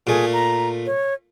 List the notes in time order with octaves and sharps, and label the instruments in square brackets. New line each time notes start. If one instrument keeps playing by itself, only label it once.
[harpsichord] A#2 A3 [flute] G#4
[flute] A#5
C#5